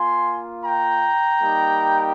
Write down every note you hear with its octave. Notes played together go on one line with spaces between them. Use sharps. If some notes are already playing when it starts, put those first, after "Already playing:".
Already playing: A#3 F4 G#5 C6
G5 A#5
G3 A#3 D#4 G4